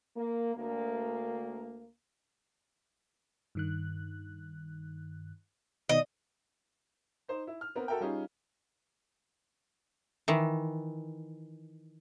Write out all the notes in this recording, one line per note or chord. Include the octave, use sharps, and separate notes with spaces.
A#3
D2 A#3
G2 D#3 F#6
B2 D#3 B3 D#5
D#4 C5
E4
F6
B3 C4 A#4 A#5
F#4 A4 A#4 E5 G5
G3 C#4 D#4 F4 G4 G#4
D#3 E3